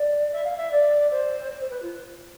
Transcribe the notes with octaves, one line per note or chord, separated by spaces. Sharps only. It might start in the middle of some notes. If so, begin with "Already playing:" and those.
Already playing: D5
E5
F5
E5
D5
C5
C5
C5
B4
F4